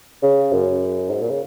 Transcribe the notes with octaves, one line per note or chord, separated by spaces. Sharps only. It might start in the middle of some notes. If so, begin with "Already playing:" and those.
C#3
F#2
G#2
A#2
C#3